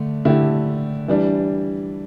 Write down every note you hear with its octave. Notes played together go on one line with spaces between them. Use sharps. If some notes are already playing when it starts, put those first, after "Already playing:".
Already playing: D3 A3
D3 A3 E4 G4
E3 G3 D4